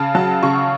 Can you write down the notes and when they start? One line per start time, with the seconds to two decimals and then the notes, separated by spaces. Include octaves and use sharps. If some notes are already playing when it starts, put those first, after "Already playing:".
Already playing: C#3 A5
0.15 F#3 A5
0.43 C#3 C#6